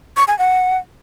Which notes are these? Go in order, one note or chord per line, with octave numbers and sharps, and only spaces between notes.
C#6
G#5
F#5